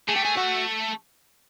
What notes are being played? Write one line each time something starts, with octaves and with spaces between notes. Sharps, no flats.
A3 G#4
G4
G#4
F#4